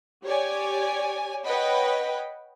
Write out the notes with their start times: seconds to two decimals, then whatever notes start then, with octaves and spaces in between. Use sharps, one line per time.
0.25 G4 C#5 D5 G#5
1.45 B4 C#5 D#5 F#5 G5 B5